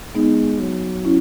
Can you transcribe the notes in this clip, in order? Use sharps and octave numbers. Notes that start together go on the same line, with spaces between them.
G#3 B3 D#4
F#3
C#4 E4